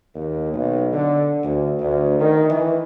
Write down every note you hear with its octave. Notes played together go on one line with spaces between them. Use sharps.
D#2
B1
D3
D2
D2
D#3
E3